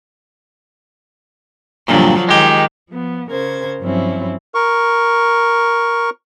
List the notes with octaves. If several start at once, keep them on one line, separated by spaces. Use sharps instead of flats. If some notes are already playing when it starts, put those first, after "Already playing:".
G2 A#2 D3 F3 F#3
D#3 G#3 G4
F3 B3
C#3 A#4 C5 G#6
G2 F3 F#3 C4 C#4 E4
A#4 C#6